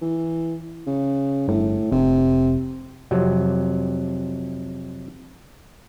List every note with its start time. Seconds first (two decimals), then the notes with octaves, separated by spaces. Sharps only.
0.02 E3
0.87 C#3
1.48 G1 A2
1.91 F1 C3
3.11 F2 C3 F#3